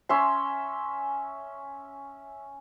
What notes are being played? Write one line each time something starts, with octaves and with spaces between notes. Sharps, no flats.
C#4 E5 C6